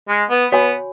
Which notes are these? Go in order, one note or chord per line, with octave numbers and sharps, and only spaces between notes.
G#3
B3
B3 F#4 C#5 G#5 B5